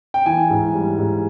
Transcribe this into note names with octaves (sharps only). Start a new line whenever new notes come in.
G5
E3 G#5
G#2
G3
G#2